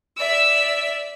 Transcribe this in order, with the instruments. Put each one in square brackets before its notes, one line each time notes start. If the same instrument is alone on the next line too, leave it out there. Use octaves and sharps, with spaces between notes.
[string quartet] D5 E5 [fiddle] E6